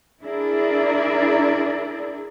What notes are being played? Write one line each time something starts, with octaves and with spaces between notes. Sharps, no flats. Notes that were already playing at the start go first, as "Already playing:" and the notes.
D4 E4 G#4 A#4 D5